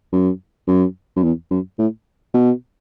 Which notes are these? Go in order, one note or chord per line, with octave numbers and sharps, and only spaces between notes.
F#2
F#2
F#2
E2
F#2
A2
B2